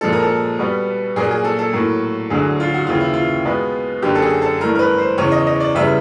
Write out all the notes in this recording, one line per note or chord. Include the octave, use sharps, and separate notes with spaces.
A#2 F3 G#3 A4
A#4
A4
B2 G3 B3
A#2 F#3 A#3 G#4
G#4
A4
A4
A2 F#3 A#3
D2 D3 F#3 G#4
F4
F#4
D#2 C#3 E3 F4
E4
F4
B2 G#3 B3
F#2 D3 F#3 A#3 G4
A4
G#4
A4
G2 E3 A3 A#4
A#4
B4
C5
E2 C#3 E3 C#5
D#5
D#5
D5
E2 C#3 E3 G3 B3 E5